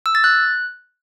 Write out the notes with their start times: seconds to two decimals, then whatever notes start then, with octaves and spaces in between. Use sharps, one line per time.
0.06 E6
0.15 A6
0.24 F#6